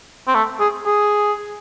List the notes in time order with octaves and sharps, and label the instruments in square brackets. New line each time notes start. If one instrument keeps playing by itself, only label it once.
[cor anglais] C4
A3
G#4
G#4